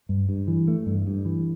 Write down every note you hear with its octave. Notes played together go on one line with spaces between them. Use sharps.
G2
G2
E3
A3
G2
G2
E3